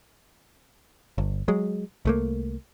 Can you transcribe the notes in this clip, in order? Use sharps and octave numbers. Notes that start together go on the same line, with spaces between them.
G1
F#3 G#3
C2 A3 A#3